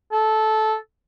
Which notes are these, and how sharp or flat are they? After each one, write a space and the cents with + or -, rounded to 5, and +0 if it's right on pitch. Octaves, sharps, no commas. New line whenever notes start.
A4 -15